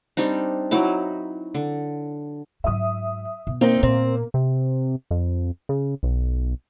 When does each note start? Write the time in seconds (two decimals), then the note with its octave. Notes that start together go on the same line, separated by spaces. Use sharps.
0.17 G3 C4 D4 D#4
0.71 F#3 D#4 E4 D6
1.55 D3
2.64 G#2 F#3 E5 D#6
3.47 B2
3.61 A#3 C4 D#4
3.83 A#2 C4
4.34 C3
5.11 F2
5.69 C#3
6.03 B1